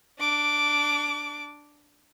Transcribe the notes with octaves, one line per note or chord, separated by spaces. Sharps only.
D4 D6